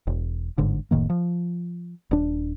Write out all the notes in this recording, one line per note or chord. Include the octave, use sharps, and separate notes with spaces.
E1
G1 G#2 D3
F1 A2 D#3 A#3
F3
D#1 D4